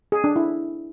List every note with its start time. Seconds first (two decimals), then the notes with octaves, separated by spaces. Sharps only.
0.12 G#4
0.24 D4
0.36 E4